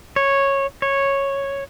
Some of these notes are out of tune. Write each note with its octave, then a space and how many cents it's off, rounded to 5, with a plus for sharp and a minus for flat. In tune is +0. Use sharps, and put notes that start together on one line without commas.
C#5 -10
C#5 -5